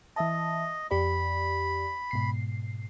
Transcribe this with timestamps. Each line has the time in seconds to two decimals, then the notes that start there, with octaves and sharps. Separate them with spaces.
0.16 E3 D#5 E5 A5
0.91 F2 G4 D5 B5
2.11 G#2 B2 C7